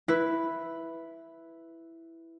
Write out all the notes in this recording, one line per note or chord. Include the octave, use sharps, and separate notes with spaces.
E4 B4